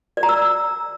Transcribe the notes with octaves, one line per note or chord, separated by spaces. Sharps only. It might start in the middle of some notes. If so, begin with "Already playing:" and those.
D5
A#5
E6